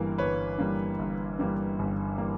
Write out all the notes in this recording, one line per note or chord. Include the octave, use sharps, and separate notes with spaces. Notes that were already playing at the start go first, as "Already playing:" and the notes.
Already playing: G1 G2 E3 G3 A#3
G1 B4 C#5
G2 E3 G3 A#3
G1
G2 E3 G3 A#3
G1
E3 G3 A#3